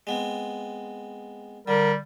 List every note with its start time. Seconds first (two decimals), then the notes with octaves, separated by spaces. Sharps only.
0.07 G#3 B3 C4
1.68 D3 G3 A#4